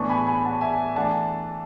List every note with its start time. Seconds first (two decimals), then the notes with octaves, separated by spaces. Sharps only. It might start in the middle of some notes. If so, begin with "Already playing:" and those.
Already playing: A2 E3 B3 D4 A5 C#6
0.09 G#5 B5
0.26 G#5 B5
0.45 F#5 A5
0.61 E5 G#5
0.96 E3 A3 D4 F#5 A5